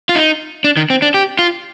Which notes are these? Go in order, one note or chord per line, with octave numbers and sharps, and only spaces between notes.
F4
D#4
D4
D#3
C4
D4
G4
F4